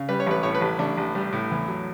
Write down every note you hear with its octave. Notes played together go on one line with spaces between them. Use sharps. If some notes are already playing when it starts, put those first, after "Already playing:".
Already playing: C#3
G3 B4
C#5
A1 B4
A2 C#5
B4
A1
A1 D4
A1
G3
A2
E2
F#3